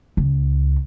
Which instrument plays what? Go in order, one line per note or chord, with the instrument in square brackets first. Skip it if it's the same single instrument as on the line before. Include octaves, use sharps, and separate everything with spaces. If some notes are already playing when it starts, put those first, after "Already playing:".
[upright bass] C#2